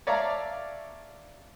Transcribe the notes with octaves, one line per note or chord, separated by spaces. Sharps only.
C#5 D5 E5 F5 A5 A#5